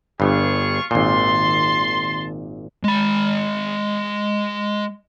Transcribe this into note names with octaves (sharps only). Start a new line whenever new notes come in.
G1 G2 F4 G#4 C#6
G#1 A#2 A5 C6
G#3 B5